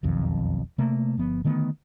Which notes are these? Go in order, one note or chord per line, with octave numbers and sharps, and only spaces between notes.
E1 B1 F2 D#3
C3 A3 A#3
G1 F3 B3
D3 D#3 A3 B3